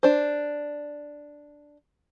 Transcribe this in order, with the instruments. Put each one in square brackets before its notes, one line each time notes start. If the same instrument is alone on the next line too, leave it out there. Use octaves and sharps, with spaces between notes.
[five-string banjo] D4 C5